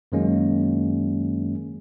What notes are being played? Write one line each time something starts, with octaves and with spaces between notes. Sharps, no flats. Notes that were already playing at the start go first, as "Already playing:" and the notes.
F#2 D#3 F#3 G#3 A#3 C#4